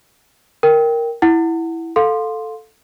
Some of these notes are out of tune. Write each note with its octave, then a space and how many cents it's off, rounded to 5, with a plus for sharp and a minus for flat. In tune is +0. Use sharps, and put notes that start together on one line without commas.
A#4 +0 G5 +0
E4 +0 F#5 +0
A4 +0 F5 +20 C6 +0